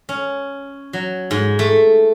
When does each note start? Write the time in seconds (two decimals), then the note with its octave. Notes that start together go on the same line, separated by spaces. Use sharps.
0.09 C#4
0.93 F#3
1.31 G#2
1.59 A3